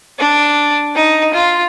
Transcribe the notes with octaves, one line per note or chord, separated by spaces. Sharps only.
D4
D#4
F4